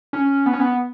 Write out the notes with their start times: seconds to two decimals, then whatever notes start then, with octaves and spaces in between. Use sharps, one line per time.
0.13 C#4
0.46 B3
0.53 C#4
0.60 B3